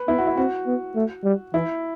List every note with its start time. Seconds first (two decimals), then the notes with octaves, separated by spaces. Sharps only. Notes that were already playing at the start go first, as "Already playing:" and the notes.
Already playing: B4
0.08 B3 E4
0.18 F#4
0.27 E4
0.37 C4 F#4
0.66 B3
0.95 A3
1.24 G3
1.54 E3 E4